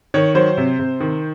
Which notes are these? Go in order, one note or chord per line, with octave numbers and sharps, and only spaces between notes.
D#3 C#5
F#3 C5
C3
C3
D#3